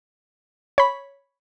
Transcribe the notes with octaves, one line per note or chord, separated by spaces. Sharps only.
C#5 B5